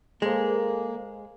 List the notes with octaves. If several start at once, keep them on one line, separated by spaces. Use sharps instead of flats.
G#3 A#3 G#4 A4 C5